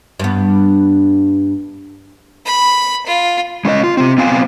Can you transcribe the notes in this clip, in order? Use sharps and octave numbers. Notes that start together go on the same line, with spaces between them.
G2 B3
B5
F4
G#3 C#4 C5 D#5
F4
C3 C4
B3 C4 C5 F5 G#5